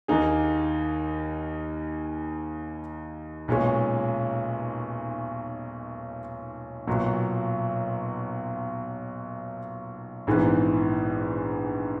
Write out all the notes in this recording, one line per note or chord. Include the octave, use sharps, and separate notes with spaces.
D#2 D#3 A#3 D#4 G#4
B1 A#2 G#3 C#4
B1 A#2 F#3
A#1 G#2 E3 B3